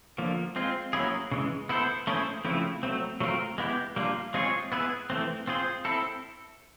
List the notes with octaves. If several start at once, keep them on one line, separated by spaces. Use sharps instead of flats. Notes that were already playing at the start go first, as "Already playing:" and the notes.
D3 F3 A#3
G#3 C4 F4
F#3 A#3 C#4 E4 G#4
C#3 E3 G#3
B3 E4 A4 C5
A3 C#4 E4 G#4 C5
C#3 F3 A3 C4 E4
F#3 A3 C4
F#3 A3 C4 F4 A#4
G#3 B3 E4 G4
G3 A#3 D4 F4
G#3 C4 F4 G#4 C#5
B3 E4 G#4 B4
E3 A3 C4
C4 F4 G#4 C5
C4 E4 A4